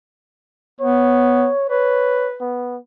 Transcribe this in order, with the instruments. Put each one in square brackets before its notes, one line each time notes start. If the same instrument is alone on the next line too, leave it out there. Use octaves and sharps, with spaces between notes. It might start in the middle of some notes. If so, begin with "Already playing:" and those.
[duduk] B3 [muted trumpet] C#5
[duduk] B4 [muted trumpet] C#5
[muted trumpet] B3